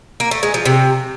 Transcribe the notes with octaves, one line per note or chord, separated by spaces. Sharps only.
A#3
A3
G#3
F3
C3